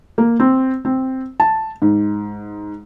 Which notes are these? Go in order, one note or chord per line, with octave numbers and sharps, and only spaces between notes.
A#3
C4
C4
A5
G#2